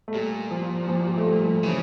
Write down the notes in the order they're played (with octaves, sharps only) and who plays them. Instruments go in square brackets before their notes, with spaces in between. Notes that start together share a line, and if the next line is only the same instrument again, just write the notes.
[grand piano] A3
[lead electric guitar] A#2 [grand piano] G3
[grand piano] F3
F3
G3
A3
G3
G3
F3
[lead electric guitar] C#3 [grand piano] E3